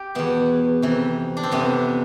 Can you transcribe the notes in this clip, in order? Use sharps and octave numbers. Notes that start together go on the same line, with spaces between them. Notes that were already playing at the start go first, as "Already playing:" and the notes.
Already playing: G4
E2 B2 B3
F2 C3 E3
D4
C4
F2 C3 E3 B3